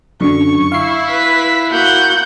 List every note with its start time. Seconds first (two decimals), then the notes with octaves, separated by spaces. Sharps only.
0.21 F#2 D3 C#6
0.72 E4 F5 C7
1.10 B4 B6
1.71 A#3 F#4 F#5 G6